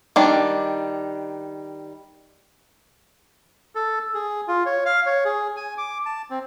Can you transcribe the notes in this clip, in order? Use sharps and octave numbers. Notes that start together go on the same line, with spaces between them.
D#3 G3 D4
A4
G#4
F4
C#5
F5
C#5
G#4
G#5
D6
A5
C4